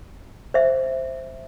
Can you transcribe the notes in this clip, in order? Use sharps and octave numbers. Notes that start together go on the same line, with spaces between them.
C5 E5